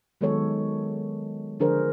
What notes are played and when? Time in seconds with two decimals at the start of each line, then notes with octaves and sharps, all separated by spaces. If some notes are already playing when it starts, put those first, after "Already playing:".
0.21 D#3 F#3 G#3 B3 A4 C#5
1.60 D3 F3 D4 G#4 A#4 C5